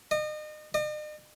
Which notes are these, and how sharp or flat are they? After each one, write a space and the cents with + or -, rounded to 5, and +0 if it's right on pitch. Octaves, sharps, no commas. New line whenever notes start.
D#5 -35
D#5 -45